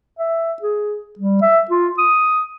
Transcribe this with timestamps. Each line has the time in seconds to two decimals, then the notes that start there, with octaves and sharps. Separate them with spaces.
0.19 E5
0.62 G#4
1.19 G3
1.42 E5
1.71 F4
1.98 D#6